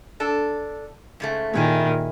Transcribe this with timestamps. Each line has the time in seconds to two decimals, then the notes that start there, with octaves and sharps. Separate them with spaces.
0.20 D4 A4
1.20 G#2 C#3 A3
1.54 A#2 D#3 C#4 E4 G#4